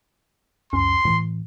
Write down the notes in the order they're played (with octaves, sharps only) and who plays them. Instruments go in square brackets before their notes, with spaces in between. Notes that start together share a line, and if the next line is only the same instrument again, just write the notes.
[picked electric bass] C#2 F#2 C#4 [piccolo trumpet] C6
[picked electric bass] A2 E3